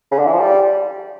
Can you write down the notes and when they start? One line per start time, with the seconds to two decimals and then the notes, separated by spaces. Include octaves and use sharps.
0.12 C#3
0.19 D3
0.26 E3
0.33 F3
0.40 G3